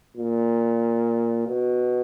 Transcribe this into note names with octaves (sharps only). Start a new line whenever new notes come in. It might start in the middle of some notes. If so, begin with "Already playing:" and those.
A#2
B2